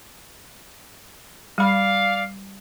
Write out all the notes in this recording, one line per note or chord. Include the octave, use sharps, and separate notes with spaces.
G3 D5 F5 B5